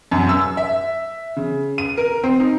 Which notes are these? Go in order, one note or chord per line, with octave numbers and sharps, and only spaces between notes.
F#2
E6
E5
C#3
D#7
A#4
C4
D#4